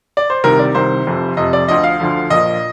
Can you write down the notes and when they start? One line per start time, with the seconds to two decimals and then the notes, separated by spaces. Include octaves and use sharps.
0.17 D5
0.30 C5
0.44 C2 C3 D#3 A#4
0.59 D5
0.75 C2 C3 D#3 C5
1.07 F1 F2 C3
1.37 F1 F2 C3 D#5
1.53 D5
1.68 D2 D3 F3 D#5
1.84 F5
2.00 D2 D3 F3
2.30 A#1 A#2 F3 D#5